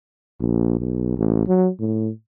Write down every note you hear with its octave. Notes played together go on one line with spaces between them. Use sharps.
A#1
B1
A1
F#3
A2